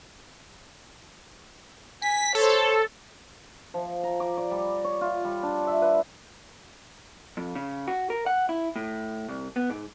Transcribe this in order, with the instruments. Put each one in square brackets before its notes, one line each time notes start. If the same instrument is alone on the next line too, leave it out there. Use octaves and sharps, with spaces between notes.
[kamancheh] G#5 [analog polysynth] B6
[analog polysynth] A4 [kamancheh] C5 C#5
[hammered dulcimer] F3
A#5
D6
D5
G3
C#5
F4
G3
D4
E5
B4
[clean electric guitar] F2
C#3
F#4
A#4
F#5
E4
A2
C2
B3
G#2